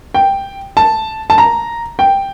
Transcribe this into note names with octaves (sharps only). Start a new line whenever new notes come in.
G5
A5
A5
A#5
G5